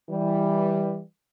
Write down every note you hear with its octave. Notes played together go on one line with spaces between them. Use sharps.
E3 G3